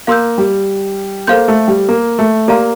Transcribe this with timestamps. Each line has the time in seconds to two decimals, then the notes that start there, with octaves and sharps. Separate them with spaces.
0.07 A#3 F5 C6 E6 G6
0.38 G3
1.27 A#3 A4 C5 F5 C6 G6
1.48 A3
1.68 G3
1.89 A#3
2.19 A3
2.48 A#3 G4 D5 F5 A#5